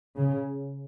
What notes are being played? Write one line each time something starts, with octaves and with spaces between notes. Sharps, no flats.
C#3